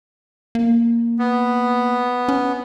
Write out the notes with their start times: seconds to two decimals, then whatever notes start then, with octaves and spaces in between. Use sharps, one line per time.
0.55 A#3
1.19 B3
2.29 C#4